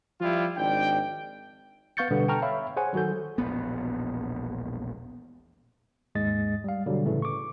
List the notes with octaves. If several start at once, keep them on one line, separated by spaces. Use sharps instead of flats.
F3 G3 E4 F4 G4
G#1 D4 G5
B3 F5 C#6 G6 A6 C#7
B2 D3 G3 B3
G5 A5 A#5 C#6 F6
C#5 E5 F5 B5
G#4 C5 C#5 F#5 G#5
D#3 F#3 F#4 A4 G6
E1 A#1 B3
D#2 G#2 G#3 D#5 A6
G3 F5
B2 D3 F#3 G3
A2 C#3 E3 A3
C#6 D6